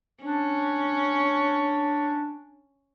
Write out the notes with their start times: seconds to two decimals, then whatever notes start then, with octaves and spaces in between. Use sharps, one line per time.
0.23 C#4 D4